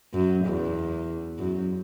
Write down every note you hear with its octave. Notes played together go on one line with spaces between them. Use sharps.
F#2
E2
F#2